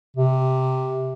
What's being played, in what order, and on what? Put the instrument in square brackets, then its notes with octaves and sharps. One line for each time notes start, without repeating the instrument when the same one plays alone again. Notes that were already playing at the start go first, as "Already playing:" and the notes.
[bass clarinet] C3